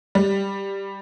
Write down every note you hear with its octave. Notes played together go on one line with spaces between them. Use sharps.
G3